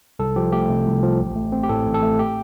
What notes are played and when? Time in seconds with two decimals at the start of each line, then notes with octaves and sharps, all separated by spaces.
0.19 C2 A4
0.36 F3 G4
0.52 A3 G4
0.69 C3
0.86 C2
1.03 F3
1.20 A1
1.36 A3
1.52 C4
1.63 G4
1.69 A2 A4
1.86 A1
1.94 A4
2.02 A3
2.19 G4